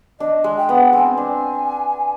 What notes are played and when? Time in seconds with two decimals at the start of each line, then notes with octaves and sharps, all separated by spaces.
0.20 D4 D#5
0.44 G#3
0.56 G5
0.69 B3
0.93 C4 G#5
1.18 D4